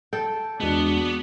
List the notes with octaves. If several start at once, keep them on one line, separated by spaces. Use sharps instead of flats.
A4 G5
E2 G#3 B3 D4 F#4